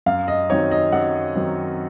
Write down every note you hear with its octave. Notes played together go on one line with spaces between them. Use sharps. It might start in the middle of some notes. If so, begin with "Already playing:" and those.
F#2 F5
D#5
D#3 F#3 C4 D#4 C#5
D#5
F#2 F#5
D#3 F#3 C4 D#4